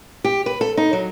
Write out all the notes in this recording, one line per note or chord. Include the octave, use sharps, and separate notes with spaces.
G4
B4
A4
D#4
F#3